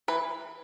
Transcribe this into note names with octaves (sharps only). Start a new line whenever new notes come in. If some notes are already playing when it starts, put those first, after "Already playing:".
E3 B4